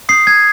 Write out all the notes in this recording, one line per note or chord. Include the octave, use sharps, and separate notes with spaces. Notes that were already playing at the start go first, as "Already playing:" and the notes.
D#6 G6 C7
G#6